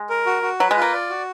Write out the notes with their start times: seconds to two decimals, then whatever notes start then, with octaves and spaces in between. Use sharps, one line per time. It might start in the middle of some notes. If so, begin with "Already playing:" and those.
Already playing: G#3
0.10 A#4
0.26 F#4
0.42 F#4
0.60 F#3 B4
0.71 G#3
0.77 F4
0.82 A#3
0.93 D5
1.10 F#4